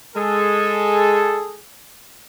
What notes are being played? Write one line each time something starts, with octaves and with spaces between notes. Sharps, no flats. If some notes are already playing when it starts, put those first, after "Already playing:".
G#3 G#4 A4